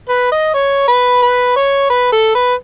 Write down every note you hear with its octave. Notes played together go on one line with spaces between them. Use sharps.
B4
D#5
C#5
B4
B4
C#5
B4
A4
B4